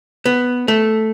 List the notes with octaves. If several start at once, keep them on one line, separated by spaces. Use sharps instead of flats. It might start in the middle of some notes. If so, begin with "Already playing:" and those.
B3
A3